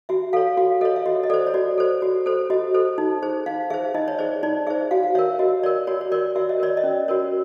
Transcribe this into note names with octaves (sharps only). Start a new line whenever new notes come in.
F#4 E5
A4 C#5 F5
F#4 F5
A4 C#5 D#5
E5
F#4 D#5
D#5
A4 C5 D5
C#5
F#4 D5
A4 C5
F#4
A4 C5
F#4 D#5
A4 C5
D#4
G#4 C5
D#4 F5
G#4 C5 E5
D#4 D#5
C#5
G#4 C5 D5
D#4 D5
G#4 C5 E5
F#4 F5
F5
A#4 C#5 E5
F#4 D#5
A#4 C#5 D5
F#4 C#5
C#5
A#4 C#5 D5
F#4 E5
D#5
A#4 C#5 D5
D#5
C#4
F#4 A#4 C#5